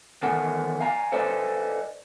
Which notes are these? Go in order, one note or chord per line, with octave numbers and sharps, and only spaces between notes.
D#3 E3 B3 A4 F#5 G#5
F5 G#5 A#5
A4 B4 C5 D5 D#5 G#5